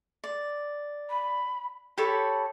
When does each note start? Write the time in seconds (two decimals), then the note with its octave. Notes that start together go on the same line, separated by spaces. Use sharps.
0.24 D5
1.09 B5
1.98 G4 A4 C#5 B5